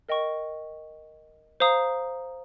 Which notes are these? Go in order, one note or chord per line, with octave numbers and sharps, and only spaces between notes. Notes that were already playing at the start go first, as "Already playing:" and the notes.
A#4 D#5 G5 C#6
C5 F5 A#5 D#6